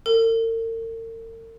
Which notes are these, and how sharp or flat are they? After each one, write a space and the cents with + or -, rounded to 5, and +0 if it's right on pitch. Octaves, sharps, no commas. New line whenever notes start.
A#4 -45